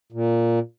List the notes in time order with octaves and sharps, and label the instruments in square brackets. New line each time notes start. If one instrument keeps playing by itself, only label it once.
[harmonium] A#2